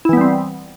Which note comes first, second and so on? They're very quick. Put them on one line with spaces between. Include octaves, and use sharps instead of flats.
E4 E3 B3 G3 C4